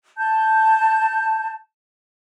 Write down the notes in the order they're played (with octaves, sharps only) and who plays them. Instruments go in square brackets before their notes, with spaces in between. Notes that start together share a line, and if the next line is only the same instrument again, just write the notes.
[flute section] A5 G6